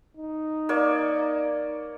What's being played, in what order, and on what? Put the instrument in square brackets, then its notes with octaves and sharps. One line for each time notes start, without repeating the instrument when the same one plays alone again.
[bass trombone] D#4
[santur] A#3 C#5 D5